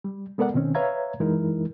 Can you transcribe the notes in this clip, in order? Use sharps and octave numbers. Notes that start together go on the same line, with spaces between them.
G3
G#3 B3 A4 A#4 D5 F#5
B2 D#3 C4 C#4
B4 C#5 E5 F5 A#5 G#6
F#2 E3 G#3 D#4 E4 A#4